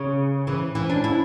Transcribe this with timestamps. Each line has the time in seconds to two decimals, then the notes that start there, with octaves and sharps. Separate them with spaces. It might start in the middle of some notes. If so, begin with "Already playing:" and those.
Already playing: C#3
0.47 E3
0.75 E3
0.90 D4
1.04 E4